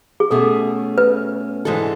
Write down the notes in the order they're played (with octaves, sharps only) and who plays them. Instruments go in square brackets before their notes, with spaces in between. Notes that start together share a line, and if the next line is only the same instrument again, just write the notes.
[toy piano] G#4
[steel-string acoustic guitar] B2 A3 C#4 [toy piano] A4
[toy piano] B4
[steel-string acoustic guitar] G#2 E3 G#3 D4 A4